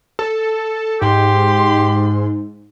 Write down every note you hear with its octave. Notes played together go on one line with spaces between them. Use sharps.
A4
G#2 G4 C6